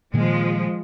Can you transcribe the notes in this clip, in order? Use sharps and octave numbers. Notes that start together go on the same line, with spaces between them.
A#2 D#3 F3 G#3 A#3